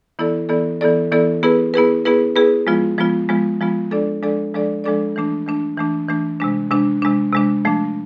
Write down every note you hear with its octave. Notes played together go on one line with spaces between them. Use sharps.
E3 B3 E4 A4 D5
E3 B3 E4 A4 D5
E3 B3 E4 A4 D5
E3 B3 E4 A4 D5
B3 E4 G#4 B4
B3 E4 G#4 B4
B3 E4 G#4 B4
B3 E4 G#4 B4
F3 G#3 B3 F4
F3 G#3 B3 F4
F3 G#3 B3 F4
F3 G#3 B3 F4
F3 G#3 D4 A4 D5
F3 G#3 D4 A4 D5
F3 G#3 D4 A4 D5
F3 G#3 D4 A4 D5
E3 A3 D4
E3 A3 D4
E3 A3 D4
E3 A3 D4
C3 G#3 D4
C3 G#3 D4
C3 G#3 D4
C3 G#3 D4
F3 A3 D4